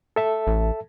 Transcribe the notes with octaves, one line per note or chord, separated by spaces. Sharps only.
A4 E5 A5
A1